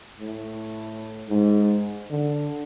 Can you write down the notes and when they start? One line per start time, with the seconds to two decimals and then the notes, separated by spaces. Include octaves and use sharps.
0.20 A2
1.29 G#2
2.10 D3